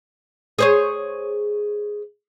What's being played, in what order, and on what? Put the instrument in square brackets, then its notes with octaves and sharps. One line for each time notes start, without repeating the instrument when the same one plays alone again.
[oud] G#4 C5 C#5